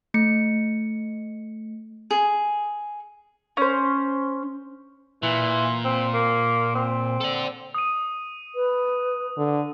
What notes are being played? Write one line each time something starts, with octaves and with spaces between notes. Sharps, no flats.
A3 C#7
G#4
C#4 C5
A#2 E3
C4
A#3
C4
A4 D5
D#6 D#7
B4
D3